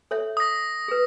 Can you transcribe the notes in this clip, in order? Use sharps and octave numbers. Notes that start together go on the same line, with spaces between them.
A4 C#5 E5
D#6 A#6
G#4 B4